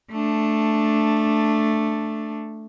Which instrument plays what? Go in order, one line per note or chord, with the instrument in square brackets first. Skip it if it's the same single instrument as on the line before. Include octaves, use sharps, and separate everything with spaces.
[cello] A3 D4